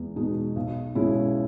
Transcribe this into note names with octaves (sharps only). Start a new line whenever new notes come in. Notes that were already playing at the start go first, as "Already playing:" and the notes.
Already playing: E2 G#3
B2 G#3 D#4
B1
B2 G#3 C#4 E4